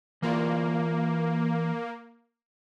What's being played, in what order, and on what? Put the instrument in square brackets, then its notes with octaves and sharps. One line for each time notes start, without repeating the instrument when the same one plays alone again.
[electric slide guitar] E3 F4 D5 [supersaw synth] A#3